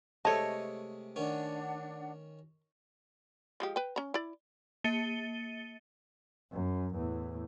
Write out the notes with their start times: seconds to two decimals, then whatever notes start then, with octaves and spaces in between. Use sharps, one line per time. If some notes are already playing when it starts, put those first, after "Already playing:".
0.25 C3 G#3 A3 A4 C#5 D#5 A5
1.16 D#3 C#4 D4 F#5
3.60 F3 G#3 G4
3.76 B4 G5
3.96 C#4 A#5
4.14 E4 D5
4.84 A#3 A6 C#7 D#7 G7
6.52 F#2
6.95 E2 A2